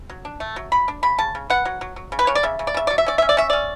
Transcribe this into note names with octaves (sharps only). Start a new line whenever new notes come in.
F#3
D4
A3
F#3
F#3 B5
D4
C#3 B5
C#3 A5
C#3
B3 F#5
F#3
F#3
F#3
C#3
B4
C#3 C#5
D5
C#3 E5
C#3
D5
C#3 E5
F#3 D5
E5
C#4 D5
C#4 E5
D5
C#4 E5
C#4 D5